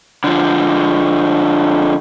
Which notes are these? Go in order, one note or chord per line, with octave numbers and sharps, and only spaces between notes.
D3 F3